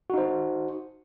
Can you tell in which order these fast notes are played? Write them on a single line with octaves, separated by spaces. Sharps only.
F#4 D#4 C5